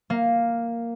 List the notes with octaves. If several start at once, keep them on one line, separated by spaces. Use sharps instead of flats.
A#3